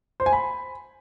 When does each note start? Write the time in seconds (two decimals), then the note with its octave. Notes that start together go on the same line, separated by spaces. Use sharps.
0.20 C5
0.26 G#5
0.33 B5